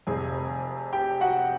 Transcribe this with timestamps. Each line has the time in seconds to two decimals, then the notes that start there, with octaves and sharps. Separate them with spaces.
0.07 F1 F2 C3 G#4 G#5
0.93 G4 G5
1.21 F#4 F#5